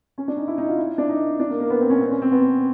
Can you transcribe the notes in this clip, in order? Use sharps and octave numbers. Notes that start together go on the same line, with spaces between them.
C#4
D4
D#4
E4
D#4
F4
E4
D4
D#4
D4
A#3
A#3
B3
C4
C#4
C4
C#4
C4
B3